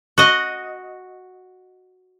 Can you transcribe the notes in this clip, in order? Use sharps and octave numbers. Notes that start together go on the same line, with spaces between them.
F#4 D#5